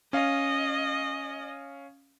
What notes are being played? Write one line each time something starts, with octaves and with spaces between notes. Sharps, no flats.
C#4 D#5 F5